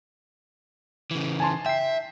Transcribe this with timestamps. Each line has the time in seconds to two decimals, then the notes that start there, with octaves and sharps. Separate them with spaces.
1.11 C#3 E3
1.40 G#5 A5 C6
1.66 E5 G5 C7